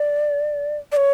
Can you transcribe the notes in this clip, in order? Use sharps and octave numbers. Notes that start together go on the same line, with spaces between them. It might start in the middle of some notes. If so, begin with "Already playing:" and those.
Already playing: D5
D5
C#5